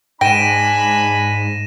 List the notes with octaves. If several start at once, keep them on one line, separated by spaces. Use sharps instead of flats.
G#2 D4 G5 G#5 B5 A#6 D#7 E7